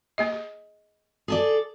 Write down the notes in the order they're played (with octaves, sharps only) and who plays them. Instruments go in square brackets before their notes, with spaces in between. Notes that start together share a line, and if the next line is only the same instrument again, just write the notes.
[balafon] A#3 G#4 D#5
G#4
[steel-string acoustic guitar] G#4 A4 D5